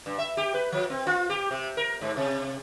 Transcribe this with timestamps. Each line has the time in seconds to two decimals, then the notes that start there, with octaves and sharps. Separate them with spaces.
0.06 G2
0.18 E5
0.37 G4
0.54 B4
0.72 F3
0.90 C4
1.07 F4
1.30 G4
1.51 C3
1.77 A#4
2.01 G#2
2.17 C3